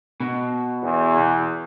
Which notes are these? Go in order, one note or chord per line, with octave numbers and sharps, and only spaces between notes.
B2
E2